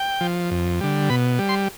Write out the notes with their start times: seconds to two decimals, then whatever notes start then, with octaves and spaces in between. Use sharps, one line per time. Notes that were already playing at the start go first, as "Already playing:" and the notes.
Already playing: G5
0.21 F3
0.51 F2
0.80 D3 G3
1.10 B2 B5
1.39 G3
1.49 C6